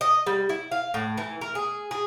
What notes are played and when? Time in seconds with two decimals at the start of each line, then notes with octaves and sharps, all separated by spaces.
0.01 D#5
0.26 G3
0.49 E4
0.71 F5
0.94 A2
1.18 E3
1.41 A#4
1.55 G#4
1.91 G#4